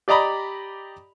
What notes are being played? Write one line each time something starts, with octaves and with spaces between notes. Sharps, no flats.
G4 D5 D#5 A#5 B5